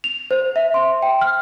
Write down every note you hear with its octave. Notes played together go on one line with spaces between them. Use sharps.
F7
C5
E5
C6
G5
F6